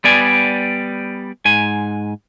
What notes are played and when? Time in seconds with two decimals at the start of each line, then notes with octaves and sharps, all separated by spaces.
0.04 G3 B3 D5 G#5
1.45 G#2 G#5